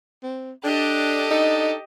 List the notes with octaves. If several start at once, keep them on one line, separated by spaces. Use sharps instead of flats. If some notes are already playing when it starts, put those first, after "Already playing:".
C4
D4 G4 A4 D#5
D4 D#4 A4